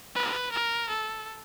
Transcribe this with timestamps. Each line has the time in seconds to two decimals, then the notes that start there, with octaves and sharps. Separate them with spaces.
0.14 B4
0.52 A#4
0.89 A4